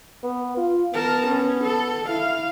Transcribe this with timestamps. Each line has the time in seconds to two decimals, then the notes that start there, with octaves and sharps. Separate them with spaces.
0.24 B3
0.57 F4
0.94 B3 A#4 A5
1.27 C#4
1.64 A4
2.09 E4 F5